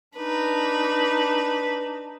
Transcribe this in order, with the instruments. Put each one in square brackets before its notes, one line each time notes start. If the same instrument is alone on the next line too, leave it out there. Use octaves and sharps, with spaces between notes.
[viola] D4 D#4 [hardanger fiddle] B4